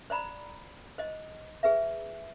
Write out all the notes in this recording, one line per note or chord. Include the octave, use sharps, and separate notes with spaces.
C5 D5 A#5 B5
C5 D#5
G#4 B4 E5